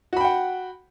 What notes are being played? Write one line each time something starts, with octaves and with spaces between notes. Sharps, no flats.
F#4 F#5 G5 B5